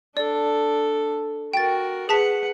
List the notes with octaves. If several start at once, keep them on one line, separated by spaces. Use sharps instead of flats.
D4 A4 D5
F#4 A#4 G5 A6
G#4 B4 F#5 A5 B6